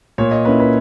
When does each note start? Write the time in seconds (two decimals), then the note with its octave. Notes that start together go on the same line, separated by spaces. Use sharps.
0.18 A#2 C#5
0.31 D#5
0.45 A#3 C#4 E4 B4
0.60 B4